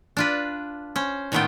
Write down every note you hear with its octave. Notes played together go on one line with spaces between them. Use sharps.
D4 F4 B4
C#4 C5
A2 D#3 A3 B3 F4 G5